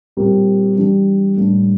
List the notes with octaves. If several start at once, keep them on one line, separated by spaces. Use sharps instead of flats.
A#2 G3 C4 G4 A#4
E3 G3 D4 G4
A2 G3 A#3 D4